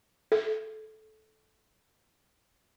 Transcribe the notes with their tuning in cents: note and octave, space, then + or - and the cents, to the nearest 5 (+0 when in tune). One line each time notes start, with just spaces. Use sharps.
A4 -15